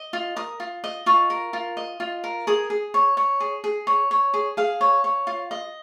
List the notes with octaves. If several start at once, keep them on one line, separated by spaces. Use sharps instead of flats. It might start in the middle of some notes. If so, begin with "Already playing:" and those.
Already playing: D#5
F4
A#4 D#6
F4
D#5
F4 C#6
A#4
F4
D#5
F4
A#4
G#4 D#6
G#4
C#5
C#5
G#4
G#4
C#5
C#5
G#4
G#4 F5
C#5
C#5
F4
D#5